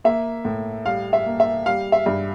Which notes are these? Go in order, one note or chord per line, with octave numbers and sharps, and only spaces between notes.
A#3 E5
A2
G3 F5
E5
A#3
E5
G3 F5
E5
G2